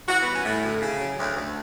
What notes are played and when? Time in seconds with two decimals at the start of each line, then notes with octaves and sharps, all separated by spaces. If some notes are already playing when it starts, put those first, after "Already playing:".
0.08 E3 F#4
0.22 G3 B3
0.36 C#4
0.45 A2
0.63 D2
0.81 C#3
1.00 F#3
1.18 D2
1.36 D2